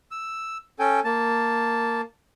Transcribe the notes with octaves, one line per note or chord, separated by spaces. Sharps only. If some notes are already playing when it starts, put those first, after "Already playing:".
E6
C#4 A4 G5 G#5
A#3 A5